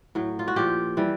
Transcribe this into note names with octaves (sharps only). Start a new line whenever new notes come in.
A2 F#3
F4
F#4
A#2 F3 G4
E3 G3